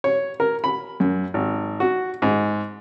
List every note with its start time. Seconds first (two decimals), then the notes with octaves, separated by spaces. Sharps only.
0.04 C#5
0.40 A#4
0.64 B5
1.00 F#2
1.34 G#1
1.80 F#4
2.22 G#2